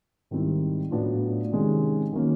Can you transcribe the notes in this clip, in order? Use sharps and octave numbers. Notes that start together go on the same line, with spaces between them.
G#2 D#3 G3 C4 E4
A2 F#3 B3 D4 F4
C3 D#3 G#3 C#4
D#3 F#3 A#3 C#4